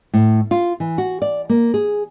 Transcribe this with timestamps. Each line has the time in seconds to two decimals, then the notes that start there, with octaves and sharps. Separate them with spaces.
0.14 A2
0.51 F4
0.80 E3
0.98 F#4
1.22 D5
1.49 A#3
1.74 G#4